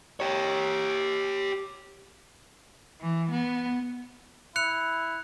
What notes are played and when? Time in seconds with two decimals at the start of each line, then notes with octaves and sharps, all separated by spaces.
0.20 G4 C#5
3.00 E3
3.30 B3
4.56 E4 F#6 C#7 F7